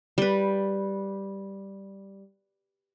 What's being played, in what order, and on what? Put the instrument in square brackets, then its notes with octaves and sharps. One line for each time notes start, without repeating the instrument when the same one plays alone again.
[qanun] G3 B4